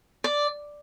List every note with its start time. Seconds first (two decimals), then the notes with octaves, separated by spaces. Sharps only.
0.24 D5